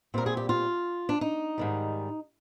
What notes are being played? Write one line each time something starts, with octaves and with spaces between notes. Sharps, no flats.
A#2 G3 C4 A#4
G#4
G4
F4
D4
D#4
G#2 D#3 G3